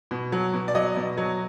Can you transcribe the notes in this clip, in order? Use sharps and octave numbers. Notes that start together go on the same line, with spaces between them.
B2
F#3
B2
D5
F#3 D#5
B2
F#3